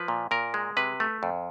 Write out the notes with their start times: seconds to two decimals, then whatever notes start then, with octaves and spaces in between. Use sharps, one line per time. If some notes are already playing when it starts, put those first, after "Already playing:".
Already playing: F3 B4
0.08 A#2
0.31 A#2 A#4
0.54 G#3
0.77 C3 B4
1.00 A3
1.23 F2